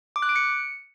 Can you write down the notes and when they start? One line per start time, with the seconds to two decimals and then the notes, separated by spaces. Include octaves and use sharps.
0.16 D6
0.22 F#6
0.29 D7
0.36 C#7